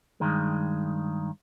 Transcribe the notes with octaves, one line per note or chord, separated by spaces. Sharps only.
G2 D#3 G#3